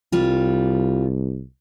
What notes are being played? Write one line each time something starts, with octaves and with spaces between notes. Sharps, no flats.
C2 G3 F4